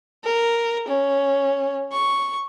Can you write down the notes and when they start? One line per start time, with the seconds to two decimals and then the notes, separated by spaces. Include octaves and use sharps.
0.24 A#4
0.88 C#4
1.92 C#6